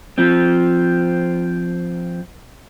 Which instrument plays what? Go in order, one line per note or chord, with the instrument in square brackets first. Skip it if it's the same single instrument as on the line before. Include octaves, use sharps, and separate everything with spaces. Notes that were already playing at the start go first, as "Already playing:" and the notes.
[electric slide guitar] F3 C4